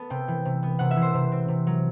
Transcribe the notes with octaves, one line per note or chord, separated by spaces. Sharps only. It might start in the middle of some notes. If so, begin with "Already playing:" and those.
Already playing: A3 B3 A5
C3 G5
E3
C3
B3
C3 F#5
E5
E3
C5
C3
C4
C3
F#3